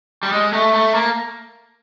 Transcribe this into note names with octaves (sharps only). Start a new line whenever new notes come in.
G3
G#3
A3
A3
A#3